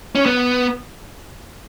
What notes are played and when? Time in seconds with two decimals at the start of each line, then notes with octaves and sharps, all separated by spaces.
0.15 C#4
0.26 B3